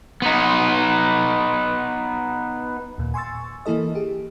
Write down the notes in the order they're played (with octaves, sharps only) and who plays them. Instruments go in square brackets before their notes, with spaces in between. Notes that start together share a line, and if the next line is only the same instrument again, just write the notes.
[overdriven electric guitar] B3 D#4
[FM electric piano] D#2 A#2
G#5 C6 C#6 E6 A6
E3 A#3 E4 A4 D#5
G4 G#4